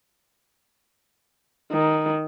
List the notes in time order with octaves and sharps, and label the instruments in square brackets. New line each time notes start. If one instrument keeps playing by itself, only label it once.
[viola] D#3